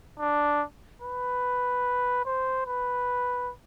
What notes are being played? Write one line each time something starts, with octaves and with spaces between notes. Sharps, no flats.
D4
B4
C5
B4